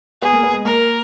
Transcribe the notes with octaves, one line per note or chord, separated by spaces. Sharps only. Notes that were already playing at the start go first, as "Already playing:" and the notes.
B3 G#4
A#3
B3
G#3
A#3 A#4